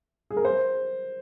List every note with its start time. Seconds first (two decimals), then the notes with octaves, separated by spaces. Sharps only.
0.31 G#4
0.37 A#4
0.45 C5